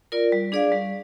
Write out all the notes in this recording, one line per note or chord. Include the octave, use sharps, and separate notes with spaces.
F4 A#4 D5
G3
D4 G#4 D5 F5
G3